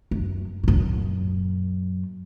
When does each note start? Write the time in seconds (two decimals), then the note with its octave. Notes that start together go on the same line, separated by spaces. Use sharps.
0.11 F#2
0.63 F#2 A#2